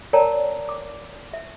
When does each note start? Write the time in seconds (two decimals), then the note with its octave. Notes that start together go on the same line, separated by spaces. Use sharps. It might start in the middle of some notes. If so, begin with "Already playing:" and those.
0.13 A#4 C#5 D5 G5 A5 A#5
0.69 D6
1.33 E5